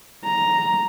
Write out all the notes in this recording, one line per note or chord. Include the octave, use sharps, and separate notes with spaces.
A#5